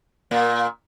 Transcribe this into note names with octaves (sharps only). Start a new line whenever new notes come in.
A#2 A#3